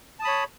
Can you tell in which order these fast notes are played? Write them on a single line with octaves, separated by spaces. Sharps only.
A5 D#6 B5 C#5